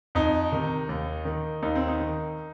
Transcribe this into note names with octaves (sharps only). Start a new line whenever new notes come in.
F2 D#4
C3 D#3
D#2
D#3
D#2 D#4
C4
D#4
D#3